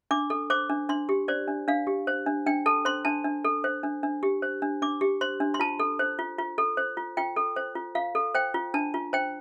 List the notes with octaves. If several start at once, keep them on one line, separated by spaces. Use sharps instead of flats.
D4 D6
A4
C5 D6
D4
D4 C6
G4
C5 D5
D4
D4 F5
G4
C5
D4
D4 G5
A4 A5
C5 C6
D4 A5
D4
A4
C5
D4
D4
G4
C5
D4
D4 D6
G4
C5 C6
D4
C6
F4 A5
A4
C5
F4
F4
A4
C5
F4
F4 G5
A4
C5
F4
F4 F5
A4
C5 G5
F4
D4 A5
F4
C5 G5